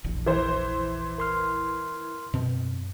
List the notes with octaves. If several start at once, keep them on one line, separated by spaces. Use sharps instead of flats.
F1 A#1 E2
E3 C5
A#4 C6 F6
F#2 B2 C4